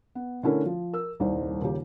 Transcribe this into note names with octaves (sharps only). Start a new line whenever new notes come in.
B3
D3 A3 C#4 E4 A#4
F3
A#4 E6
D#1 C2 D#3 C5
D#2 C#3 F4 G4